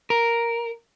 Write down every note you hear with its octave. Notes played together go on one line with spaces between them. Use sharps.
A#4